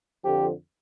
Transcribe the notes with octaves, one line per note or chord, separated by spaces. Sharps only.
F2 D3 F3 G4